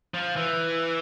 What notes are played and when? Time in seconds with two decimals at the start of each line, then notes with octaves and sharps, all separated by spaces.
0.14 F3
0.36 E3